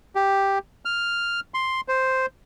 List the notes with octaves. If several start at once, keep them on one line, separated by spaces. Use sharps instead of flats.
G4
F6
C6
C5